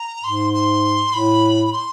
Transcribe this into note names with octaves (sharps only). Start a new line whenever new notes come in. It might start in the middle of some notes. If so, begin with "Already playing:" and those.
Already playing: A#5
G#2 C6
C6
A2 B5
B5
C6